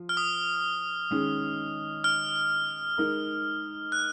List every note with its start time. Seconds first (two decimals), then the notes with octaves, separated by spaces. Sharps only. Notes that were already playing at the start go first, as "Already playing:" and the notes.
Already playing: F3 F4
0.09 F6
0.17 D#6
1.11 D#3 G#3 C#4
2.04 F6
2.98 G#3 D#4 A#4
3.92 F#6